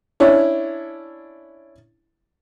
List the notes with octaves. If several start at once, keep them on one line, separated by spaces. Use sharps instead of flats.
C#4 D4 E4 C#5